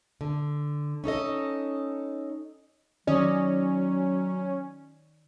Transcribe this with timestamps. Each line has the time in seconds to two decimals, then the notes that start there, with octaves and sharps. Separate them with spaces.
0.21 D3
1.04 C#4 D#4 A4 D#5
3.07 D#3 F#3 C#4 D5 D#5